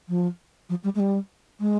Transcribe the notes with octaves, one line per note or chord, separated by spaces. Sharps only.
F3
F3
G3
G#3
G3
G#3